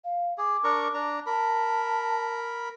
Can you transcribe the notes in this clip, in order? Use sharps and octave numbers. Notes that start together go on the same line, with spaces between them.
F5
G#4 D6
D4 A#4 C#6
D4 A#5
A#4 A5 B5